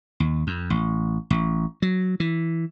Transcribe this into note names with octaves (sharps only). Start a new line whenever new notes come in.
D#2
F2
A1
A1
F#3
E3